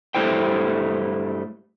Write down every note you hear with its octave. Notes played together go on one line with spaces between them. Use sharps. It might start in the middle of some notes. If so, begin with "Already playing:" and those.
G2 G3 A3 E4 C5 G5